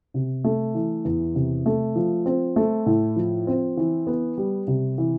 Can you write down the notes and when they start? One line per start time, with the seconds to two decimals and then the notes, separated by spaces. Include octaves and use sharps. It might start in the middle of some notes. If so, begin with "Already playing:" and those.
0.14 C3
0.44 A3
0.75 E3
1.05 E2
1.35 C3
1.66 A3
1.96 F3
2.26 C4
2.56 A3
2.86 A2
3.16 F3
3.47 C4
3.77 E3
4.07 B3
4.37 G3
4.68 C3
4.98 E3